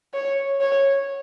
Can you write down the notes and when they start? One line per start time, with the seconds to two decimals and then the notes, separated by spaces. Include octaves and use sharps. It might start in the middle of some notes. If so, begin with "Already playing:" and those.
0.14 C#5
0.60 C#5